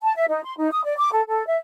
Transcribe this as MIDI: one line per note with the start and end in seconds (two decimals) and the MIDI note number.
0.02 0.15 81
0.16 0.24 76
0.29 0.44 63
0.45 0.53 84
0.58 0.69 63
0.72 0.82 87
0.84 0.94 74
0.98 1.11 86
1.11 1.22 69
1.28 1.46 69
1.47 1.56 76